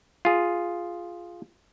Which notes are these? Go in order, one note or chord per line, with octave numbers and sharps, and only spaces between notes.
F4 G#4